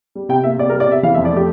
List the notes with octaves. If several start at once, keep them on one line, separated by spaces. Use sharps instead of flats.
G3
C3 G5
A#3 E5
C3 D5
A#4
G3
D5
C3 E5
E3 F5
E5
F2
D5
A3 G4